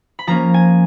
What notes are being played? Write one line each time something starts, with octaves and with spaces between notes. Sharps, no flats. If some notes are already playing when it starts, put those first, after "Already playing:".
B5
F3 A#3 C#4 A#5
G#5